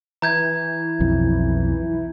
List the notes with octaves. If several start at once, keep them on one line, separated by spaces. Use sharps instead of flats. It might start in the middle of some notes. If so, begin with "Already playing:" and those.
E3 A#5 G6 G#6
B1 F2